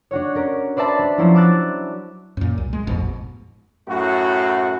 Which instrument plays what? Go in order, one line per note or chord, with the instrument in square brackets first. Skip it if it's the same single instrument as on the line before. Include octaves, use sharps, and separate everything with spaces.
[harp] D4 F#4 C#5
C#4 A#4
B4 C5 D5 E5 A5 B5
D4
F3 F#3 C#4 E4 C5
D6 E6 F#6 A6
[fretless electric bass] F#2 A#2
C2
G#3
A1 F2 G#2 B2
[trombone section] F#2 A2 F#4